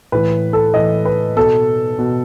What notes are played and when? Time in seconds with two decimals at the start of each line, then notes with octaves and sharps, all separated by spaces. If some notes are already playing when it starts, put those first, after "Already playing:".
0.12 A2 E3 B4
0.53 A4
0.74 A2 E3 D#5
1.05 B4
1.37 B2 A4
1.99 B2